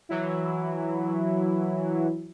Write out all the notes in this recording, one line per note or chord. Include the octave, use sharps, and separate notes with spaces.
E3 F#3 E4